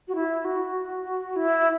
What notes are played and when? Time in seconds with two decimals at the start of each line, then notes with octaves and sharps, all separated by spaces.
0.08 F#4
0.15 E4
0.45 F#4
1.36 E4